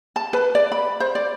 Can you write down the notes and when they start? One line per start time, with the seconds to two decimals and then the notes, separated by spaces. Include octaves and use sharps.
0.16 A5
0.33 B4
0.55 D5
0.72 B5
1.00 C5
1.15 D5